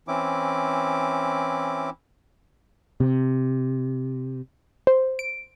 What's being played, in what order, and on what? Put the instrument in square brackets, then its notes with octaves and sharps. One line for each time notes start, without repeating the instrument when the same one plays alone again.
[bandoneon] E3 C4 C#4 E4 D6
[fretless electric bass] C3
[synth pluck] C5
D7